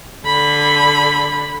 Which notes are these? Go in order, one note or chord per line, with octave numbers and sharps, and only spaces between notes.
D3 B5